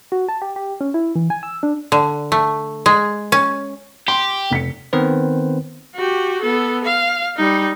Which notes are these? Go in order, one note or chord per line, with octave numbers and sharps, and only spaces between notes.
F#4
A5
G4
G4
C#4
E4
E3
G#5
E6
D4
D3
A3
G#3
C#4
G4 C6
F1 B6 C#7
D#3 B3 C4 B4 C5
F#4 G4
B3 A4
F5
G3 D#4